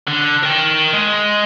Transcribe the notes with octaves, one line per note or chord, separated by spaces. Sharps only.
D3
A#4 G5
G#3